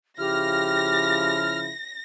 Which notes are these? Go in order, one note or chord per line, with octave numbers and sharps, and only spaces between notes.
C#3 F3 E4 G4 F6 A#6